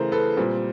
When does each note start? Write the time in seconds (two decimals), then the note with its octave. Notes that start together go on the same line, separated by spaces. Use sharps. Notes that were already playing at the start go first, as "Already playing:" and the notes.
Already playing: C#3 E3 A3 A#4 C5
0.12 A4 B4
0.37 A#2 G3 C4